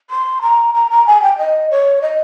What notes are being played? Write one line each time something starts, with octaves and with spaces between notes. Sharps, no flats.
C6
A#5
A#5
A#5
G#5
G5
D#5
C#5
D#5